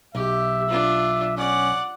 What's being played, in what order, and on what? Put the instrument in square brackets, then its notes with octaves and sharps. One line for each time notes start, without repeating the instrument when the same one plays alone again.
[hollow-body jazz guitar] B1 [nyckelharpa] G4 [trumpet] E5
[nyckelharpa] D4 F4
[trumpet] C#4 [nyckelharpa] D5 F#5